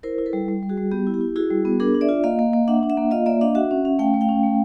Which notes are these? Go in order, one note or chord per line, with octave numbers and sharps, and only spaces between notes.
E4 A#4 C5
E4
A4 B4
G3
G3
G3
F#4 G#4
G3
B3 G4
E4
G4
E4
E4 F#4 G#4
G3
B3
D4 G#4 A#4
D4
D5 E5
F4
A#3 D#5 F5
A#3
A#3
D4 E5 F#5
D4
E5 F#5
A#3
F4 D#5 F5
A#3 D5 E5
D4 D#5 F5
F#4 E5 F#5
C#4
C#4
A3 F5 G5
A3
F5 G5
C#4
A3